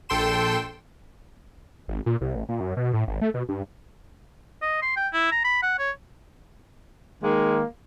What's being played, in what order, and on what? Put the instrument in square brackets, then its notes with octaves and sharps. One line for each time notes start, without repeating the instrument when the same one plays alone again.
[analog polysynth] A#1 A4 G5 C6 E7
[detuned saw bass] G#1
A#2
C2
A1
A#2
F#2
B2
A2
G#1
A3
B2
G2
[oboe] D#5
C6
G5
E4
A#5
B5
F#5
C#5
[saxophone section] D#3 G#3 A#3